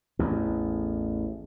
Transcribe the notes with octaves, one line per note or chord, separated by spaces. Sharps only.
A1 E2